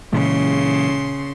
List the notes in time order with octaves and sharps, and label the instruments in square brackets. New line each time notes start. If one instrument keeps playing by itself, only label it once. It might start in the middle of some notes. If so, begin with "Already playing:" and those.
[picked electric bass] A#2 E3 G#3 [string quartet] C#3 C6